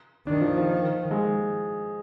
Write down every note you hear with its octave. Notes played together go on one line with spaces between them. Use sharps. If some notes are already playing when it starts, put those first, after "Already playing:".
D#3 D4
F3
F3
G#3